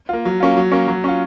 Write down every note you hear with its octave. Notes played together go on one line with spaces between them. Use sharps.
A#3 F4
F#3
A#3 C#4 F4
F#3
A#3 C#4
F#3
C#4 F4